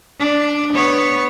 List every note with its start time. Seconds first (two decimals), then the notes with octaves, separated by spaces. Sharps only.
0.19 D4
0.73 B3 C#5